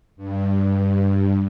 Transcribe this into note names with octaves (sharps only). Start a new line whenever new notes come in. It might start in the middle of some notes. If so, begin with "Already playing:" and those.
G2